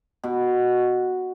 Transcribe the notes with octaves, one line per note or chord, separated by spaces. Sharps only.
B2